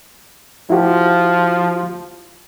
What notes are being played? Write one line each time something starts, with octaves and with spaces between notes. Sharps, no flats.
F3 E4 F#4 G4